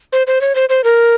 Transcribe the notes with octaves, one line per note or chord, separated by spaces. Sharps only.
C5
C5
C#5
C5
C5
A#4